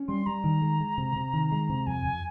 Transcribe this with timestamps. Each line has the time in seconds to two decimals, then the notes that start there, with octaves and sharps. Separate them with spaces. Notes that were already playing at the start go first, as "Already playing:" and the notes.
Already playing: C#4
0.08 G3 C6
0.26 G3 A#5
0.44 D#3
0.62 G#3
0.80 G#3
0.98 C3
1.16 C3
1.33 D#3
1.52 G#3
1.69 C3
1.87 F2 G#5
2.05 F2